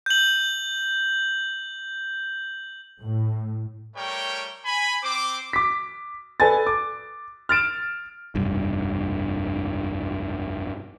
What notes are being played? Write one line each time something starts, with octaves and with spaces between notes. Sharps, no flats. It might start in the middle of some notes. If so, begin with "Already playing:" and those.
G6 F#7
A2
G3 A3 A#4 C#5 G5
G#5 B5
C4 C5 D6
D6 B6
A4 B4 D5 G#5 A5 A6
D6
F6 A6 D7 E7
F1 B1 G2